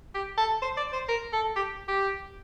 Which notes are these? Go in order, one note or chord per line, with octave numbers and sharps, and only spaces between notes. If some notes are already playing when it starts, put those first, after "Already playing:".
G4
A4
C5
D5
C5
A#4
A4
G4
G4